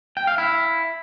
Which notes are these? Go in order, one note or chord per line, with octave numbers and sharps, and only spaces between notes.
G5
F5
E4